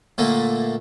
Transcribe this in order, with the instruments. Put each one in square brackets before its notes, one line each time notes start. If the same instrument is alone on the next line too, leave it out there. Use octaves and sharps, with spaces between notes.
[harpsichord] A#2 D3 A3 A#3